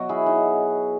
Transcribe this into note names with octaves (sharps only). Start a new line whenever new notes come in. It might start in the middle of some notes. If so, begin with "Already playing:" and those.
Already playing: B2 F#3 F#4
E4 G#4
D#4 F#4